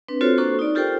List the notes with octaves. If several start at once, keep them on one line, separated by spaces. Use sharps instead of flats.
C4 D4 B4
C4 F4 F#4 A4 C5 C#5
A#3 D4 F#4 A4 C5 C#6
D#4 D5
F4 G4 A4 A#4 C5 G5